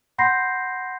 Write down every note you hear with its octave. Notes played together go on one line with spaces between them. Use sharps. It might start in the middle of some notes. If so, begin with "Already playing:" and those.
F#5 B5 C6 G6 A#6 C7